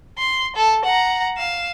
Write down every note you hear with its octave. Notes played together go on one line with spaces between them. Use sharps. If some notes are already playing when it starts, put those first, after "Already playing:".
C6
A4
F#5 A#5
F5 E7